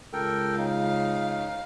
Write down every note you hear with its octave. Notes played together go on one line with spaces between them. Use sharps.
C#2 A4 A#4 G5
C#3 D#4 F5